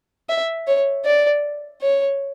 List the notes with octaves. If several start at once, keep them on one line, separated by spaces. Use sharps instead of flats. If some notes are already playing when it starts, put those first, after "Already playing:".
E5
C#5
D5
C#5